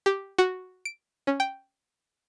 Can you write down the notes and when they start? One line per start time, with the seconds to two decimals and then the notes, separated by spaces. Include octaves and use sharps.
0.06 G4
0.39 F#4
0.85 D7
1.27 C#4
1.40 G5